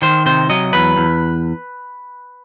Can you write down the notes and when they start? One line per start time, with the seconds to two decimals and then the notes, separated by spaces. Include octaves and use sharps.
0.02 D#3 C5
0.26 C3 C5
0.49 F#3 D#5
0.73 E2 B4
0.96 E2